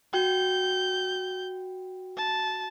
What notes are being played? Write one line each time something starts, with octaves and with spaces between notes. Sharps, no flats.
F#4 G5 G6
A5